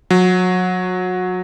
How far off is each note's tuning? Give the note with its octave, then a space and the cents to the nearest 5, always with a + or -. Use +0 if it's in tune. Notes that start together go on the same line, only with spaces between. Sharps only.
F#3 -25